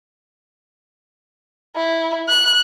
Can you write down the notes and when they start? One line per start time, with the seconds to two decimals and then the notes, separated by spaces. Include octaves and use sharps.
1.76 E4
2.28 F#6